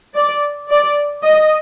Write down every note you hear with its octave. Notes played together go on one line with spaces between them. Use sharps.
D5
D5
D#5